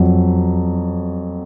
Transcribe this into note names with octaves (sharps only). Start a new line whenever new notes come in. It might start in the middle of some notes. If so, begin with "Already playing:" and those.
Already playing: F2 F#3